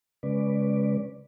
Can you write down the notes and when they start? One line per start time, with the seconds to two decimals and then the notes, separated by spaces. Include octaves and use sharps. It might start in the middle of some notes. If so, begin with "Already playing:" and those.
0.23 C#3 G#3 C#4 B4 D5